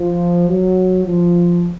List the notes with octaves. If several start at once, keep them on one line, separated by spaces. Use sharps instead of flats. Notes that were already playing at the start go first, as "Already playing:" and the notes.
Already playing: F3
F#3
F3